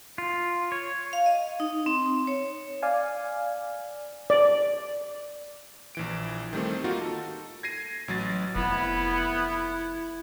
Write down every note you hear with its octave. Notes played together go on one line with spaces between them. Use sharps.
F4
C#5
F5
D#5
D#4
C4
C#5
D5 F5 G#5
D5
A#1 E3 D7
D#3 G3 A3 C4
A#3 D#4 F4 F#4
A4
G#6 A#6 C7 D#7
A1 F#3 A6
F1 B3 E4